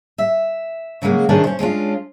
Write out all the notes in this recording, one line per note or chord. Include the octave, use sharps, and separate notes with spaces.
E5
C#3 F#3 G#3 A#3 F#4
C3 D#3 E3 C#4 D4 G#4
C#4 C5
G#3 C#4 D4 F4